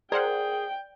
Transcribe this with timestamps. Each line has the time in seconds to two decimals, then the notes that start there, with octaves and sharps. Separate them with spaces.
0.12 G#4 A#4 C5 D5 F#5 G5